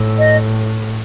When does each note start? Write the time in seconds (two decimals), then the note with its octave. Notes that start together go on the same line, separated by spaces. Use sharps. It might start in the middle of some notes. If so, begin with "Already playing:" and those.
Already playing: A2
0.18 D#5